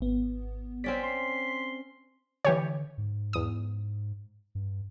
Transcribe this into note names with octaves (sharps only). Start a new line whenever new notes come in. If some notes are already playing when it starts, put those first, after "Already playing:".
G#1 B3
C4 C#4 D5 B6
C6
D3 E3 G4 C#5
G#2
E2 D#6
G2